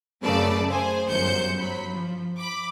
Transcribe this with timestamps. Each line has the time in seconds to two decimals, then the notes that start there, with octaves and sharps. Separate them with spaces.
0.22 F#2 C#3 A3 B4 D5 A5
0.69 G#4 C5 G#5
1.09 G1 F#2 C5 G6 C#7
1.59 F#3 B5
1.92 F3
2.38 B5 D6